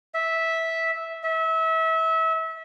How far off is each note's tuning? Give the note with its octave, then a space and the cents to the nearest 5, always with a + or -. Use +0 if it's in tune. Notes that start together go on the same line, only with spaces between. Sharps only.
E5 -10
E5 -30